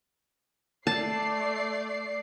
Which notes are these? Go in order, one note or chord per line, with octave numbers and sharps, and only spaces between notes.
A3 D5 A5 C7